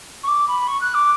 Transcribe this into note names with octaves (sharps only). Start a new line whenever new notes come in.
C#6
D6
B5
C#6
F#6
D6